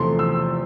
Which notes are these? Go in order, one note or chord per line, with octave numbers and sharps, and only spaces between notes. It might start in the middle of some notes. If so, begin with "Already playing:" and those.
Already playing: E2 C3 F3 A3 C6
E6